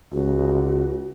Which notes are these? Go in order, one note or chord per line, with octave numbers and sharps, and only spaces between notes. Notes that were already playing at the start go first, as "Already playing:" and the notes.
C#2 F#4